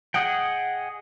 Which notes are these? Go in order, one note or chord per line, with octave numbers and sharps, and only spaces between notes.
G#4 D#5 F#5 G5